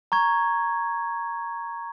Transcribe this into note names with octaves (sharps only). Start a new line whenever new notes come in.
A#5 C#6 G#6